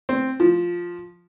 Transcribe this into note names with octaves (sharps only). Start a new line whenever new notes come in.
C4
F3